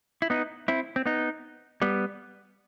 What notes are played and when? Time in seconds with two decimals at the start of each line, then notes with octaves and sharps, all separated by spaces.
0.22 E4
0.30 B3 D#4
0.68 C4 E4
0.96 C4
1.06 B3 D#4
1.82 G3 B3